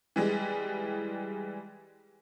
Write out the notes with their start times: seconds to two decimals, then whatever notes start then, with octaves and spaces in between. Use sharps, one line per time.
0.16 E3 G3 G#3